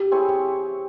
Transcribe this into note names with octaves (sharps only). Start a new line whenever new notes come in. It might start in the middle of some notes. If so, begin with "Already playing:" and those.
Already playing: G4
C4 E4 G#4 C#5